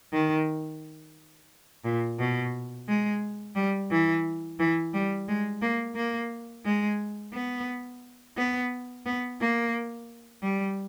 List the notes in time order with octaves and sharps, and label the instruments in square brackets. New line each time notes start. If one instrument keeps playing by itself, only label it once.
[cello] D#3
A#2
B2
G#3
G3
E3
E3
G3
G#3
A#3
A#3
G#3
B3
B3
B3
A#3
G3